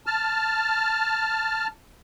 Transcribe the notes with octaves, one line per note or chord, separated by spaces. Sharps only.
A5 F6